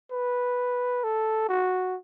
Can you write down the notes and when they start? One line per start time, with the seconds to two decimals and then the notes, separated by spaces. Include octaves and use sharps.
0.12 B4
1.04 A4
1.49 F#4